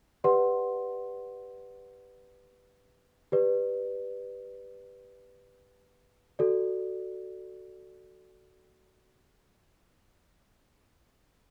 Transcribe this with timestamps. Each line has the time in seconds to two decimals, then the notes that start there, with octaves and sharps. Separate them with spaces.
0.24 G4 B4 D5 F#5 C6
3.32 G4 B4 D5
6.39 F#4 A4 D5